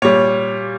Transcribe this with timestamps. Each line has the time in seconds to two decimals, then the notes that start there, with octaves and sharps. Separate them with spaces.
0.02 A#2 G3 C#5